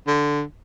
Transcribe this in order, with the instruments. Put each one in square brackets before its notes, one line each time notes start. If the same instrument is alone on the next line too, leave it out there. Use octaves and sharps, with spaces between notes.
[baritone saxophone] D3